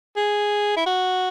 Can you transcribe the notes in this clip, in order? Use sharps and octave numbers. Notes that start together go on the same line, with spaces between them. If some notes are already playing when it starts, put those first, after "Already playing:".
G#4
E4
F#4